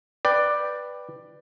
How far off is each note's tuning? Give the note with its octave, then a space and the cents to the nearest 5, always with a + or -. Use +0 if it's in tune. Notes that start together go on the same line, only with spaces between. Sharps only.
B4 +0 D5 +10 G5 +0